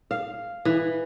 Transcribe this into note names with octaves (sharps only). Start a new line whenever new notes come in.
F5
E3